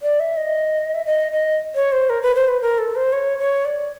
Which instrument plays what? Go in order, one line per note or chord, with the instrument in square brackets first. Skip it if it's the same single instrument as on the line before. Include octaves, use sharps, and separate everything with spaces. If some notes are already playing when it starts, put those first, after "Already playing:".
[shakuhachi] D5
E5
D#5
E5
D#5
D#5
C#5
C5
A#4
B4
C5
B4
A#4
A4
C5
C#5
C#5
D5